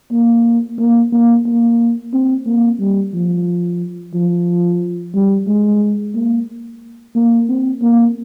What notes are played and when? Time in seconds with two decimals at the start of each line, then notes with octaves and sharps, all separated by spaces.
0.11 A#3
0.78 A#3
1.12 A#3
1.45 A#3
2.13 C4
2.46 A#3
2.80 G3
3.14 F3
4.14 F3
5.15 G3
5.47 G#3
6.14 A#3
7.15 A#3
7.49 C4
7.82 A#3